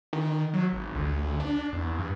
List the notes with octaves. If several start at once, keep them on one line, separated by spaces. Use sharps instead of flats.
D#3
F#3
G#1
D2
D4
E2
G2